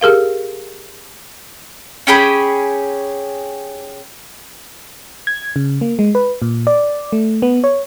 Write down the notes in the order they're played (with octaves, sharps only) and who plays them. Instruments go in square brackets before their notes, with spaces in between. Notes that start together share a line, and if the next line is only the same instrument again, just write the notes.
[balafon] G4 G#4 A#4 F5
[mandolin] C#4 G4 G#4 B5
[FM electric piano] G#6
C#3
A#3
G#3
B4
A#2
D5
A3
B3
C#5